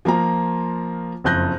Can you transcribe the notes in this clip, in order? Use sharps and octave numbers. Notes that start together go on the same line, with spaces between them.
F3 A#3 F4 A#5
F#1 F2 F#6 G6 A#6